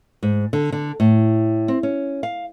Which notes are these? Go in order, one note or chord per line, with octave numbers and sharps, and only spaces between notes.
G#2
D3
D3
A2
C4
C#4
F5